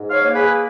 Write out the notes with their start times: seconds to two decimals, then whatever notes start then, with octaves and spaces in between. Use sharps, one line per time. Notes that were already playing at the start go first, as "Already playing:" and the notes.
Already playing: G#2
0.10 C#5 F5
0.22 A#3
0.34 G#4 B4